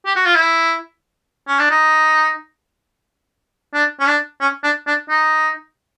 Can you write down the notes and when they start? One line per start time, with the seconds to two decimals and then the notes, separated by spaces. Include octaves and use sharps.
0.06 G4
0.16 F#4
0.25 F4
0.35 E4
1.47 C#4
1.59 D4
1.70 D#4
3.74 D4
4.00 C#4
4.07 D4
4.41 C#4
4.64 D4
4.87 D4
5.09 D#4